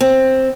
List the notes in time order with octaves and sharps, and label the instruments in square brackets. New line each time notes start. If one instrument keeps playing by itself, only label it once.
[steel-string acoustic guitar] C4